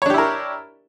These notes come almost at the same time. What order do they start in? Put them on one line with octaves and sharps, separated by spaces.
C#5 D4 G4 E4 A#4